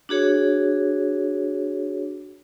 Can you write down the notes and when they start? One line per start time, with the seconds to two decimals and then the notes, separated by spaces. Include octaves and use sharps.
0.09 D4 F#4 G#4 C#5